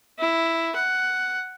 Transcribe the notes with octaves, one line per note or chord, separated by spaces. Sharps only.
E4
F#5